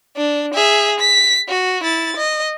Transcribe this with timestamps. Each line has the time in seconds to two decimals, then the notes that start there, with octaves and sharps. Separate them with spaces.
0.17 D4
0.54 G#4 E5
1.00 B6
1.49 F#4
1.83 E4 A6
2.17 D#5